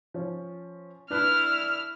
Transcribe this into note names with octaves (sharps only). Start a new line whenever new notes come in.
F3 C#4
D4 E4 B4 F6 F#6